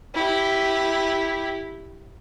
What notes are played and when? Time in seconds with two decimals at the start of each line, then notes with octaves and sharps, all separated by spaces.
0.15 E4 G4